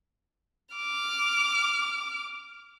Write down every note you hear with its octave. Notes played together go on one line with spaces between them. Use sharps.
D6 F6